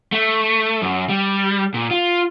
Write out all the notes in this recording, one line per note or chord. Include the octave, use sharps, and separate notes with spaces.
A3
F#2
G3
A#2
F4